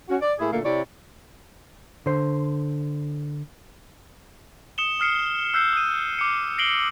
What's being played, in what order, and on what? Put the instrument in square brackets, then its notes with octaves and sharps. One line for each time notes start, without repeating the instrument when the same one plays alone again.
[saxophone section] C#4 F#4
D5
A2 A#3 E4 G#4
A#2 D3 A3 A#3
C3 E4 C#5 D5
[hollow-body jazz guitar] D3 C5
[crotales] D#6 C#7 E7 G7
D#6 F6 C7 C#7
E6 F#6 G6 C7
D#6 D#7
D6 C#7
A#6 C7 D7 F#7 G7